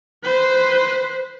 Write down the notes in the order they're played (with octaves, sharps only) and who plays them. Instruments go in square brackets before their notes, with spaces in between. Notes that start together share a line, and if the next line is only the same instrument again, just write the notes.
[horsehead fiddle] B4 C5